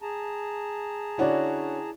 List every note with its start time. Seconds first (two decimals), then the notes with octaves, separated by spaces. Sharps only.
0.02 G#4 A5 A#5
1.18 D3 C#4 E4 F#4 C#5 D5